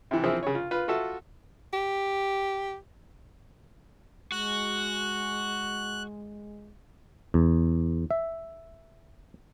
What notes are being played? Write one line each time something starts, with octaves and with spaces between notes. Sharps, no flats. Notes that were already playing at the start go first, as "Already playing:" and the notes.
C3 E3
E3 F3 C4 E4 G#4
C#3 C#5
F4
F4 B4
F4 F#4 A4 E5
G4
G#3 F#4 F#6
E2
E5